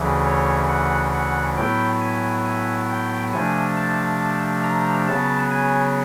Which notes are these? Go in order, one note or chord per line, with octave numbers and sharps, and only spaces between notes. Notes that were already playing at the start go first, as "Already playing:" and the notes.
Already playing: D2 C#3 E3
C#5
F#5
F#5
A2 F#3 B3 E4 G5
G#5
G#5
G5
C3 F3 A3 D4 G#5
A5
A#5
C#3 F#3 B3 A5
G#5